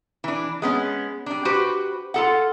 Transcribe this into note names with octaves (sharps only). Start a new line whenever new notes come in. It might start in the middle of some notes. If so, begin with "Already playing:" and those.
E3 D4
G#3 B3 C#4
G3 D4
F#4 G4 B4 C5
F4 A4 F#5